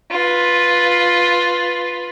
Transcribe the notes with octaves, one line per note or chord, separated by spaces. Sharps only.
F4 B4